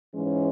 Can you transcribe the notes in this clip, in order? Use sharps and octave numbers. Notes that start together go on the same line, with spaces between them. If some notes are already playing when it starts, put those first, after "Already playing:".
G#2 E3 G#3 C#4